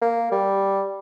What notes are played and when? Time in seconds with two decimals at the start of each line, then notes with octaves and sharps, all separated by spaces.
0.01 A#3
0.32 G3